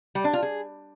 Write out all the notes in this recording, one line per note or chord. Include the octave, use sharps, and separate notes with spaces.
G3
D4
F4
G#4